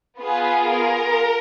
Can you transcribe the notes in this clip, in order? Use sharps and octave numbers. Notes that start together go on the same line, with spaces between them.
B3 F4 G#4 B4
A#4